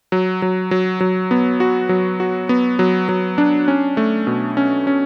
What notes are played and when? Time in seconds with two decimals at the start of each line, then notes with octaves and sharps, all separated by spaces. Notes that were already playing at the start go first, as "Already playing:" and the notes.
0.12 F#3
0.42 F#3
0.71 F#3
1.00 F#3
1.31 B3
1.60 F#4
1.89 F#3
2.20 F#4
2.49 B3
2.79 F#3
3.09 F#3
3.38 D4
3.68 C#4
3.97 A3
4.27 B2
4.57 C#4
4.87 C#4